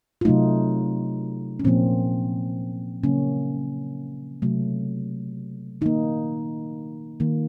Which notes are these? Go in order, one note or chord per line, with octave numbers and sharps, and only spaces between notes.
F4
C3 F#3 A3 D#4
C#4
A#2 F3 A#3 C4
C#3 F#3 A#3 C#4
C3 F#3 A3
D#3 A#3 D#4
D#3 A#3